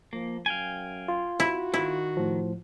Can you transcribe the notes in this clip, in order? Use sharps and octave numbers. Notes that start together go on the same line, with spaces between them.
F3 A#3
F#2 F5 G5 G#5
F4
E4 F#4
D#3 E4
A2 F3